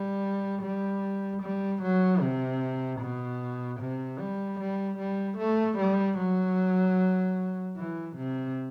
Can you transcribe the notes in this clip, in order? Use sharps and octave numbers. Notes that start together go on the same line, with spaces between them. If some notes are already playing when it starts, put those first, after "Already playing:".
Already playing: G3
G3
G3
F#3
C3
B2
C3
G3
G3
G3
A3
G3
F#3
E3
C3